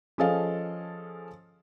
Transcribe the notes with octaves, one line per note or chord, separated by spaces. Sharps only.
F3 C#4 G#4 A4 D#5 F5